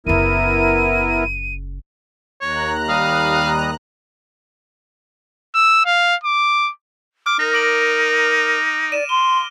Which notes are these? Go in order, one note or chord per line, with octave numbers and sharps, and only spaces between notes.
F#1 C#3 B3 E4 A#4 D#7
D#2 C#5 A#5 F#6
G3 F5 D#6
E6
F5
D6
D6 F6
D#4 A#4 A#6
D6 D7 F#7
D5 D#7 E7
C6 G7